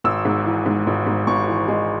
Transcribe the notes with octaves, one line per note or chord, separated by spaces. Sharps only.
G#1 E6
G#2
E3
G#2
G#1
G#2
G#1 C#6
E3
G#3